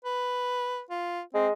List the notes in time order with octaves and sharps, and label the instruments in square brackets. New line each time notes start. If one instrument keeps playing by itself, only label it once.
[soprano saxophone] B4
F4
[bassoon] G#3 [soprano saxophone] C4